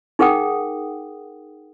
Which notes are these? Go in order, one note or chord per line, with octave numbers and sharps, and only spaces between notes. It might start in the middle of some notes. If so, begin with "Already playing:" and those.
D#4 G#4 A#4 F#5 G5 D#6